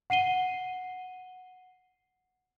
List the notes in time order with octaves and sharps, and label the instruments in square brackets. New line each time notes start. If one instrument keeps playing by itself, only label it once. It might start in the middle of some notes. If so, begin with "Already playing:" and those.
[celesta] F#5 C7 D#7 G7